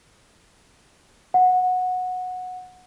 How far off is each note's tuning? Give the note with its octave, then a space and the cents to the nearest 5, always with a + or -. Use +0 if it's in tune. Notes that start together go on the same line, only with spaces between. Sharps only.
F#5 -15